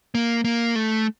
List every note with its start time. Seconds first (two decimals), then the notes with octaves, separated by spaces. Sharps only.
0.15 A#3
0.45 A#3
0.76 A3